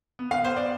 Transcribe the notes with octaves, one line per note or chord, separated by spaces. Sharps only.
B3
F5
B3 C5
D5